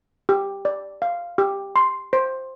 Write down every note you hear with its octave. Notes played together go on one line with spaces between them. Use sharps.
G4
D5
F5
G4
C6
C5